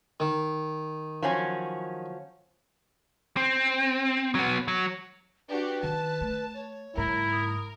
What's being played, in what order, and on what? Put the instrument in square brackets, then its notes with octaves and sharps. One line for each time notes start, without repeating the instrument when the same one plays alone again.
[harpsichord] D#3
[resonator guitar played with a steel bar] F3 F#3 C#4
[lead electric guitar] C4
F#3 B3
F#3
[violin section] D4 F#4 G4 [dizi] B4
[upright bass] D#3 [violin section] A5
[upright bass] A3
[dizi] C#5
[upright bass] F#1 G#2 [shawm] E4 [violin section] A#4
[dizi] D#6